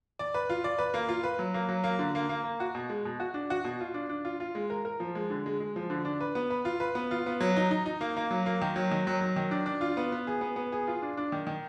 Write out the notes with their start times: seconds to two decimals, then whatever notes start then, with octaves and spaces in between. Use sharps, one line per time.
0.19 D5
0.34 B4
0.49 F4
0.64 D5
0.79 B4
0.94 A#3
1.09 F4
1.23 B4
1.39 F#3
1.54 A#3
1.69 F#3
1.84 A#3
1.99 D3
2.15 A#3
2.29 A#3
2.44 A#3
2.60 F#4
2.75 B2
2.90 G#3
3.05 B2
3.20 F#4
3.34 D4
3.50 F#4
3.64 B2
3.80 F4
3.94 D4
4.09 D4
4.25 F4
4.40 F4
4.55 G#3
4.70 A#4
4.85 A#4
5.00 F3
5.15 G#3
5.30 D3
5.46 G#3
5.60 G#3
5.76 F3
5.90 D3
6.05 D4
6.21 B4
6.35 B3
6.50 B4
6.65 F4
6.80 B4
6.95 B3
7.11 F4
7.26 B3
7.41 F#3
7.56 D#4
7.71 D#4
7.86 D#4
8.01 A#3
8.17 A#3
8.31 F#3
8.46 A#3
8.62 D#3
8.76 F#3
8.91 D#3
9.07 F#3
9.21 F#3
9.36 D#3
9.51 D4
9.66 D4
9.81 F4
9.97 B3
10.12 B3
10.27 G#4
10.41 B3
10.56 B3
10.72 G#4
10.87 F4
11.02 D4
11.17 D4
11.32 D#3
11.47 D#3